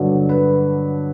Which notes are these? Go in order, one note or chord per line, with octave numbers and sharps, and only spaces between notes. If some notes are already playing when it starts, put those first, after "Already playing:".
Already playing: G2 D3 F#3
B4